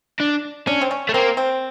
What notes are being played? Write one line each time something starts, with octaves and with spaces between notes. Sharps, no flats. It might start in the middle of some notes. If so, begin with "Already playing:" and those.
D4
C#4 D4
C4
C#4
A3
A#3 C4
C4